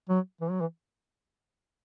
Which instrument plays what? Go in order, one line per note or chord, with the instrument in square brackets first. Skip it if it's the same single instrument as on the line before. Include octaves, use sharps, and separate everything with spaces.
[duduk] F#3
E3
F#3
E3